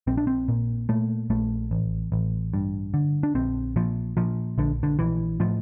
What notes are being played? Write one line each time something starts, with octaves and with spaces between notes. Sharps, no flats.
A#1 C4
D4
C4
A#2
A#2 A3
A#1 A3
A1
A1
G2
D3
D4
A#1 C4
A#2 F3
A#2 F3
A#1 D3
D3
A#1 E3
A2 F3